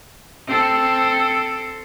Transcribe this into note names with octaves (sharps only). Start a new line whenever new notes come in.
C4 A4